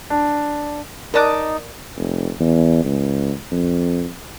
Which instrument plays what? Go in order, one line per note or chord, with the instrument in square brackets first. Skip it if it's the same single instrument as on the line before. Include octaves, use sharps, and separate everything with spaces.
[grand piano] D4
[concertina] D#4 [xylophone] A#4 D5 F#6 [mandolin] D#5 A5 D6
[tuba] F1
E2
C#2
F2